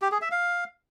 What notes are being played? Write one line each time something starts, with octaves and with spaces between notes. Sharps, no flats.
G4
G#4
E5
F5